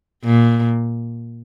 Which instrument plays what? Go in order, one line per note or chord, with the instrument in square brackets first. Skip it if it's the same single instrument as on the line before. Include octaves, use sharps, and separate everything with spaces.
[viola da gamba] A#2